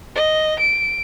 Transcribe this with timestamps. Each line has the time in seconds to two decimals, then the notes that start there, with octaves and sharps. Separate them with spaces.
0.15 D#5
0.59 D7